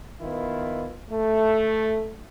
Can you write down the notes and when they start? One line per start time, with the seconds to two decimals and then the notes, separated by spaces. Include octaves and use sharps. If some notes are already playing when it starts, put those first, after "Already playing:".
0.21 D#3 B3 E4 F4
1.11 A3